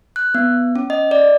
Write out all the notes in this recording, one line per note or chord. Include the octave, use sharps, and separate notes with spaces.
F#6
B3
C#4
D#5
D5